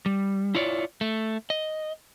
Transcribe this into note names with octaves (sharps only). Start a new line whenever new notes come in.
G3
E4 F4 C#5 D5
A3
D#5